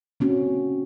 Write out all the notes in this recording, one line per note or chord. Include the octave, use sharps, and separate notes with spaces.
A#3 C4 C#4 F#4